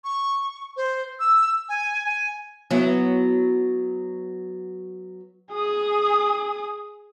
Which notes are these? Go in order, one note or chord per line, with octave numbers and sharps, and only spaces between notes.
C#6
C5
E6
G#5
G#5
F#3 B3 E4
G#4 D#6